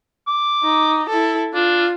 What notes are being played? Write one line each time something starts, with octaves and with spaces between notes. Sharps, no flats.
D6
D#4
E4 A4
D4 F4